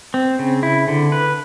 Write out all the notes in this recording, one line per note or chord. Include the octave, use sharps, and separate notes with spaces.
C4
C#3
E4
D3
B4